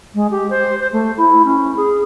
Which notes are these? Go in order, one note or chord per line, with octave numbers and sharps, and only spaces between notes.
G#3
G4
C5
C5
A3
E4
C#4
G#4